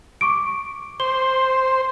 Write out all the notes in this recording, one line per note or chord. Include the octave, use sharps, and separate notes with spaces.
C#6 D6 D7
C5 G7